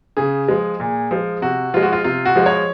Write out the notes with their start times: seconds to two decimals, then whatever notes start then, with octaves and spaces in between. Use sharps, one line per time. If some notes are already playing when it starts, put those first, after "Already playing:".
0.17 C#3 G#4
0.48 F3 G#3
0.80 A#2
1.11 F3 G#3
1.42 C3 F#4
1.74 F3 G#3 F4
1.82 F#4
1.93 F4
2.04 C3 F4
2.25 F#4
2.35 F3 G#3
2.46 C#5